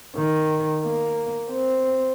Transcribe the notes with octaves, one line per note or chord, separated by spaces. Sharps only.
D#3
A#3
C4